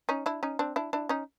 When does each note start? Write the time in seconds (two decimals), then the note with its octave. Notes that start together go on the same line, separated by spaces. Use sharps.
0.09 C#4 D#4
0.26 D4 E4
0.43 C#4 D#4
0.59 C4 D4
0.76 D4 E4
0.93 D4 E4
1.09 C#4 D#4